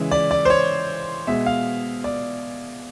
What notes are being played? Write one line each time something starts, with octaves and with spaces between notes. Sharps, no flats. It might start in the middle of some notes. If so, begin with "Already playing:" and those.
Already playing: C#3 E3 G#3 E5
D5
D5
C5
C#5
B2 G#3 E5
F5
D5